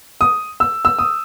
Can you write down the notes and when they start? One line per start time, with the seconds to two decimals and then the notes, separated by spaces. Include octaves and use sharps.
0.21 D#6
0.60 E6
0.85 E6
0.99 D#6